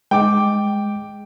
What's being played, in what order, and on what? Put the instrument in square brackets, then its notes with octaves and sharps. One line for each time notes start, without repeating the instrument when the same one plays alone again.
[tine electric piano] G#3 [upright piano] G5 D6